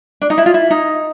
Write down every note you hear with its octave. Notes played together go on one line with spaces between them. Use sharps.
D4
D#4
E4
F4
E4
D#4